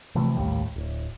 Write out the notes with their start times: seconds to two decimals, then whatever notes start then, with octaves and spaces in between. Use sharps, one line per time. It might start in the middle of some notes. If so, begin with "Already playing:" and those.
0.15 C3 E3 F3 A3
0.36 A#1 D#2 A2 G3
0.76 D1